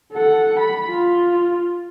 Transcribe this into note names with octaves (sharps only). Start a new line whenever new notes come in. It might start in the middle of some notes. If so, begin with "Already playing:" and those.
A4 F#5
B5
F4